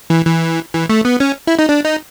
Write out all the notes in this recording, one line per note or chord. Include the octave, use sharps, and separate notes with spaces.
E3
E3
E3
A3
B3
C#4
E4
D#4
D4
D#4